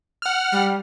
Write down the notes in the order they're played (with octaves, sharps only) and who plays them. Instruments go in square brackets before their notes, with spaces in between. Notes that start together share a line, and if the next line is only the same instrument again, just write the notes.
[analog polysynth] F#5 F6
[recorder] G3